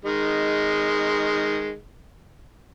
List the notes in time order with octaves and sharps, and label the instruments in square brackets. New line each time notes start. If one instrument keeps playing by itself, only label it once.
[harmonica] D#3 G#3